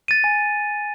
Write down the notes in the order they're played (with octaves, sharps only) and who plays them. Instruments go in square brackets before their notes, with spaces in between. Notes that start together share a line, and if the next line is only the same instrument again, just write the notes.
[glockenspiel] A6 D#7
G#5